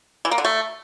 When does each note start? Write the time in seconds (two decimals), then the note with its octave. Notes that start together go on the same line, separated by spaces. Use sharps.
0.25 E3
0.31 A#3
0.38 D3
0.45 A3